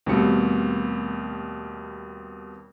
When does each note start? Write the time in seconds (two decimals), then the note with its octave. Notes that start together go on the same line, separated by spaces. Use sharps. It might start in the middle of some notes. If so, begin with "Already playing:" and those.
0.06 D#2 B2 G3 A3 C4 C#7